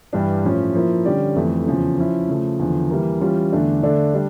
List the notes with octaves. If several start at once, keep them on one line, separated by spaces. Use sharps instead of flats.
G2 E3 G3 D4 G4
A2 F3 C#4
F3 A#3 E4
D3 G3 C#4 G4 D5
F2 E3 A3
E2 C#3 F3 C#4
F3 C#4 E4
C#3 F3 A3
E2 D3 F3
E3 G3 A#3
E3 G3 C#4 F4
E2 D3 A3 D4
D3 A3 D4 A4 D5
G3 D4